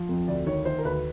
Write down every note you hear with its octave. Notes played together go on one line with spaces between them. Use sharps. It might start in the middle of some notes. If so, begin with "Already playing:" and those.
Already playing: F3
F2
D2 D5
D#3 C#5
D#3 C5
A#4
D2 B4